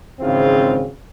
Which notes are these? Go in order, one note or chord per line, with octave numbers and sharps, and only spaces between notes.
G#1 G#2 C#3 E3 C4 F4